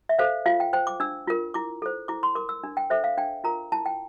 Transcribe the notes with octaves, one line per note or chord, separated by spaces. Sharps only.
E5
A4 C5 F5
F4 F5
G5
C5 G5
D6
D4 E6
F4 A#4
E4 D6
A4 C5
E4 D6
C6
A#4 D6
E6
D4
G5
A4 C5 E5
F5
D4 G5
F4 A#4 A#5
E4 A5
G5